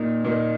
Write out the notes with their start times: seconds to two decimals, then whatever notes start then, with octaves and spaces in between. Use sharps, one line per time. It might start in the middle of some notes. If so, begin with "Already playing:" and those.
Already playing: A#2 A#3 D#4
0.24 A#2 A#3 D#4